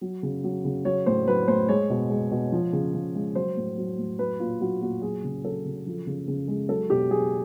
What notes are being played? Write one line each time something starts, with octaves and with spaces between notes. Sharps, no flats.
F#3
C#3
F#3
C#3
F#3 C#5
A2 C5
F#3 B4
A2 C5
G#3 C#5
B2
G#3
B2
F3
C#3
C#3
G#3
F#3 C5
A2
F#3
A2
F#3 B4
A#2 F4
F#3 F#4
A#2 F#4
F#3 G#4
C#3
F#3 A4
C#3
F3
C#3
C#3
G#3
F#3 A4
B2 G4
F#3 G#4